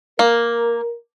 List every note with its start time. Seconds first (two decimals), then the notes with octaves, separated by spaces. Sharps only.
0.19 A#3 A#4